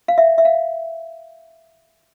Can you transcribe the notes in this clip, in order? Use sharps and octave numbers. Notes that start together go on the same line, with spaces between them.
F5
E5
E5
F5